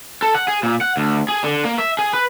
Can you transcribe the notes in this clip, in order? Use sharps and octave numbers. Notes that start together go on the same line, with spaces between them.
A4
F#5
G#4
A#2
F#5
D2
G#4
D3
A#3
E5
G#4
B4